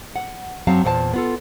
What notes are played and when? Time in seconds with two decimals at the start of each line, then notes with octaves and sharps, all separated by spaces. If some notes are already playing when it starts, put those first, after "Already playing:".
0.16 F#5
0.67 F#2 F#3 C4 F5 A5
0.84 E2 A#2 C5 G5 A5
1.14 B3 F4 A4